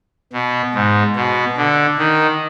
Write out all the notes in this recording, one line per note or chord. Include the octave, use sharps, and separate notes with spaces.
B2
G#2
B2
D3
D#3